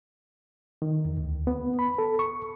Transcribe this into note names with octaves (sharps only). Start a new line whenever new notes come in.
D#3
E2
D2
B3
B5
A4
C#6